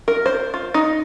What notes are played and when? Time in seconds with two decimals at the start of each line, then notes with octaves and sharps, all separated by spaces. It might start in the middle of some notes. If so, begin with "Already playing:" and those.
0.08 A#4
0.26 C5
0.54 F4
0.74 D#4